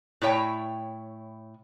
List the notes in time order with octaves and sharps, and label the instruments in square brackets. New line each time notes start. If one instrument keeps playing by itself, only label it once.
[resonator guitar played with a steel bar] A2 E4 C#5 G5